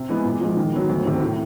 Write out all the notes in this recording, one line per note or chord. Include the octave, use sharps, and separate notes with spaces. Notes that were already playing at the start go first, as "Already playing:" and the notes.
Already playing: C3
E3 G#3 B3
A#2
F3 G#3
D#3
F#3 B3
D2
C3 D#3
A2